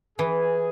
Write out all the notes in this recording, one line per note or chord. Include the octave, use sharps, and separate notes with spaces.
E3 G#4